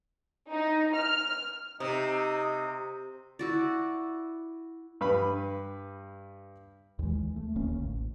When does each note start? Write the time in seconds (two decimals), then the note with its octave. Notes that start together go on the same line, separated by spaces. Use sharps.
0.51 D#4
0.95 F6
1.80 C3 D#4
3.39 E4 F#4 D5
5.01 G2 B4 B5
6.99 D#2 E3 G#3
7.36 A3
7.56 D#1 D2 A#3 C#4
7.79 A1